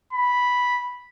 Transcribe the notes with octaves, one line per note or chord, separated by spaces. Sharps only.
B5